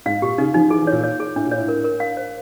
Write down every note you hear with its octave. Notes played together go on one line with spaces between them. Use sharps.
G#2 F5
A#2 G4
C#3 D#4
F3 D#4
E3 G#4
E3
A#2 C#5
C#5
G#4
A2 D4
A#2
C#5
A2
A#4
A#4
F5
C5